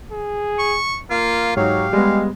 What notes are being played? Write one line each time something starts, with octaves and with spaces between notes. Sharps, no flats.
G#4
C#6
A#3 F4
G#2 F#3 D#4 G4 C#5 F5
G3 G#3 B3